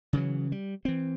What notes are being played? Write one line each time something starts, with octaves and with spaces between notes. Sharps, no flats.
C#3 E3 F#3
G3
E3 C4